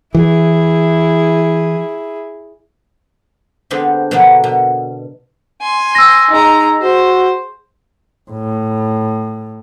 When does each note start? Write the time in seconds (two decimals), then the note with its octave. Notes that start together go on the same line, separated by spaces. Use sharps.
0.15 E3 E4 G#4
3.70 D3 G#3 B3 C4 D4 G4
4.11 B2 D3 F#3 A#3 B3 D4
4.44 B2
5.61 G#5 C6
5.95 E6 A#6
6.31 G#3 D#4 A#5
6.82 F#4 C5
8.31 A2